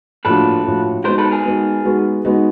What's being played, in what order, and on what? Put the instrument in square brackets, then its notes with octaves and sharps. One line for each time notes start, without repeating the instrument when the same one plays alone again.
[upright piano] A2 F3 A#3 D4 F#4 [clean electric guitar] A4 B4
[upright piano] A2 F3 A#3 D4 F#4
[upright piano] G#3 B3 D#4 F#4 [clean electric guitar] A#4 C5
[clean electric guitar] A4 B4
G#4 A#4
[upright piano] G#3 B3 D#4 F#4
G#3 B3 D#4 F#4
G#3 B3 D#4 F#4